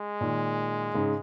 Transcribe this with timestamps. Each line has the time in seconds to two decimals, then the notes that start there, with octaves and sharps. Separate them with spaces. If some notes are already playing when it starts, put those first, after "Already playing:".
Already playing: G#3
0.21 A#2 D#3
0.94 G#2 C#3